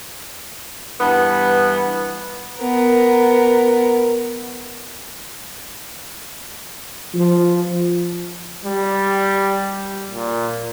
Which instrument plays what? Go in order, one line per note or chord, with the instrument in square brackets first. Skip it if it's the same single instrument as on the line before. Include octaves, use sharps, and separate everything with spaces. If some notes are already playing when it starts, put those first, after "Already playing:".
[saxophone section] G2 E3 B3
[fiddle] B3 A#4
[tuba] F3
[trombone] G3
A#2